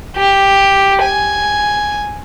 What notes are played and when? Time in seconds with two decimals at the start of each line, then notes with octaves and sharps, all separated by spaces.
0.17 G4
1.02 G#5